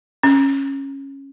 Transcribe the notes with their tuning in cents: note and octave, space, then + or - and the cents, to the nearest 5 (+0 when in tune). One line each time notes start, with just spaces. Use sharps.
C#4 -10